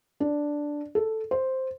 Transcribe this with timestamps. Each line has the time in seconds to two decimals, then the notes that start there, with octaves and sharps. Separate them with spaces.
0.20 D4
0.95 A4
1.31 C5